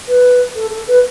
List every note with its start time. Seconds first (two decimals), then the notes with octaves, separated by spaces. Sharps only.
0.08 B4
0.56 A4
0.71 A4
0.88 B4